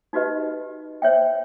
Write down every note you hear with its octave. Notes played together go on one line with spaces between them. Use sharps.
D#4 F#4 G4 B4 D#5
C5 C#5 E5 G5